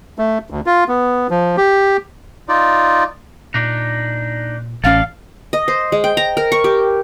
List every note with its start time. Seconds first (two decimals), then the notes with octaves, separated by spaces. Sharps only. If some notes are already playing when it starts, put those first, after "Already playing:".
0.19 A3
0.50 D2
0.66 F4
0.88 B3
1.30 F3
1.57 G4
2.48 D#4 F4 D5
3.54 A#2 D4 D#4
4.84 A1 C#4 A4 D5 F5
5.53 D#5
5.68 C5
5.92 G#3
6.04 G5
6.17 A#5
6.37 A#4
6.52 C#6
6.64 G4